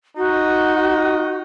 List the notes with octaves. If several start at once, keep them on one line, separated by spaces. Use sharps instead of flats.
D#4 F#4